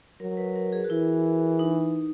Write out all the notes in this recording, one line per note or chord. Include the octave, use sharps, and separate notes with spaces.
F#3 A#4
B4
A#4
G#4
F#4
E3 E4
D#4